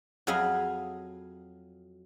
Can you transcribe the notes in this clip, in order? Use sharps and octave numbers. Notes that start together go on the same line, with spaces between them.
F2 F#3 G#4 D#5 F5 B5